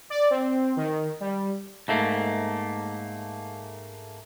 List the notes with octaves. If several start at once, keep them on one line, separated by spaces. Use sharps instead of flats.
D5
C4
D#3
G3
G#2 A3 A#3